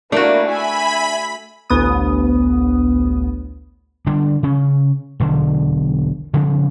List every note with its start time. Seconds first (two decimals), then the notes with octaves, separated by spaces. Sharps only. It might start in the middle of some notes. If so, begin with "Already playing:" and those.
0.12 A3 A#3 D4 E4 F#4
0.48 E5 G#5 B5
1.70 A1 D2 B3 D#6
4.07 D3 G3 D4
4.43 C#3 C#4
5.20 E1 B1 D3
6.34 C#3 F3 G3 C4